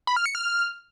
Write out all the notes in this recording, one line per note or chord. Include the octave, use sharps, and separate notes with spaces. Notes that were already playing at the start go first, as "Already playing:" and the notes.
B5
F6
C#7
F6